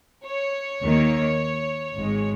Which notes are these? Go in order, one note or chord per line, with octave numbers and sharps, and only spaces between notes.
C#5
D#2 D#3 A#3
G#1 G#2 G#3